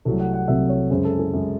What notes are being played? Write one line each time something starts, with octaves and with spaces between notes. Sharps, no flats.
C2 C3 F#3 A3 A4
F#5
F#5
C2 C3 F#3 A3 E5
C#5
F#2 C#3 G#3 C5
A4
G#4
F#2 C#3 G#3